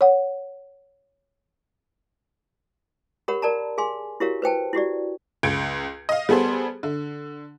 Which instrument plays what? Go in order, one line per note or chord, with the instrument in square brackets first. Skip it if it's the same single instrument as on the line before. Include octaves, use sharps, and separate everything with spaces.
[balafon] C#5 F#5
[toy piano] G4 A#4 C#5 F#5 B5
A#4 D5 A5 A#5
G#4 F5 G#5 C6
E4 F#4 G4 A#4 C#5 F5
B4 C5 G5 A5
E4 F#4 G4 D5
[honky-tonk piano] C#2 G6 G#6 C#7 D7
D#5 F5
G3 B3 G#4 A4 C5
D3